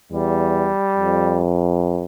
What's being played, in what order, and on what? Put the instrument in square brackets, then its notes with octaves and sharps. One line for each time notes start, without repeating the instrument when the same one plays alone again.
[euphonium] E2 [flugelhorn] G3
[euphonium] F2